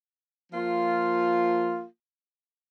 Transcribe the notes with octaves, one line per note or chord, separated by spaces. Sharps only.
F3 A#3 F4